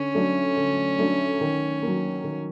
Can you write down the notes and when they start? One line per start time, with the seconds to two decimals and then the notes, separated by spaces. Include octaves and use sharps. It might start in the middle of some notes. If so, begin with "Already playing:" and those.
Already playing: D3 C#4
0.14 F#3 A3 D4
0.57 D3
0.98 F#3 A3 D4
1.41 D#3
1.82 F#3 A#3
2.24 D#3